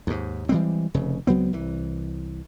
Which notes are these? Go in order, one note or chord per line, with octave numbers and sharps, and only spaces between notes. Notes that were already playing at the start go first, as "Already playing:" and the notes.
D#2 G#2
E3 G3 G#3 C4
F1 C#3
C#2 F#3 B3 C4
C2 E3